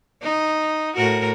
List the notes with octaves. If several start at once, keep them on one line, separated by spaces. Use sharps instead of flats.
D#4
A2 F#4 A#4